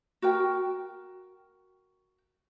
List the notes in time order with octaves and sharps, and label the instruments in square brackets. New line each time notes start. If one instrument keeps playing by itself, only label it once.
[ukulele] F#4 A#4 G5